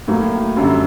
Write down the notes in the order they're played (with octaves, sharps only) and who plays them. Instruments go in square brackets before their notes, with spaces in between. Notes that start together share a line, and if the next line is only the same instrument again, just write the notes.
[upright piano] A2 F#3 A#3
F#2 D3 G3